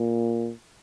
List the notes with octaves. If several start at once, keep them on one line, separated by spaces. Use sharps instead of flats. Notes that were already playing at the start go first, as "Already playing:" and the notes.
Already playing: A#2